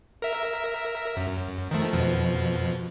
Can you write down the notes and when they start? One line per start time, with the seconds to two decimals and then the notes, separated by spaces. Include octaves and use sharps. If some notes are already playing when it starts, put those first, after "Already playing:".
0.22 A#4 E5
1.17 F#2
1.71 D#3 F3 A3
1.93 F2 B2 F3